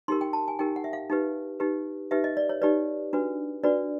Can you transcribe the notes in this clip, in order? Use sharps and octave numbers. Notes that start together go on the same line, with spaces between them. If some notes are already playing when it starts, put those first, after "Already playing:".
D#4 G4 A#4 C6
G5
A5
G#5
D#4 G4 A#4 G5
F#5
E5
F5
D#4 G4 B4
D#4 G4 B4
D#4 G4 B4 E5
D#5
D5
C#5
D#4 G4 B4 D5
D4 F#4 B4
D4 F#4 B4 D5